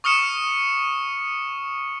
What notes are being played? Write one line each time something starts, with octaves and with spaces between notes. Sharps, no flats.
C#6 D#6 F6 C#7 E7